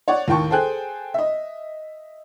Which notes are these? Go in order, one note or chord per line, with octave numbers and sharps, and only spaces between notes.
C#5 D5 F#5
D#2 A2 D#3 G5 A5 C#6
G#4 A4 C5 G5 G#5 F#6
D#5 E5